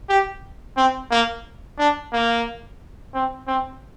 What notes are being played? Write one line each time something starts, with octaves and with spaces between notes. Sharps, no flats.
G4
C4
A#3
D4
A#3
C4
C4